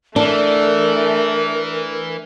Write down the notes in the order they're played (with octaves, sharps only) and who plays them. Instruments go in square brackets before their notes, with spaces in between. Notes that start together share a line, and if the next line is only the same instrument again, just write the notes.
[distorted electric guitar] E3 [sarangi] A3 [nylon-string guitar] D4 [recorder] A#4